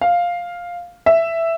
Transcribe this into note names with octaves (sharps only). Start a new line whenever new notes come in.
F5
E5